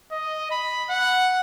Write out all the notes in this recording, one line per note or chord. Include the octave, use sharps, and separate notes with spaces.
D#5
B5
F#5